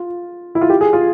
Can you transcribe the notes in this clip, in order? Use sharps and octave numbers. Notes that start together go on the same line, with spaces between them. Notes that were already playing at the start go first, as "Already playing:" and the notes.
Already playing: F4
E4
F4
G4
G#4
F4